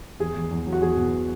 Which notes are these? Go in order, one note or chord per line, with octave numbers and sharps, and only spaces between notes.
E2 G#4
E2
E2
F#3
F#4
E2 G#4
B2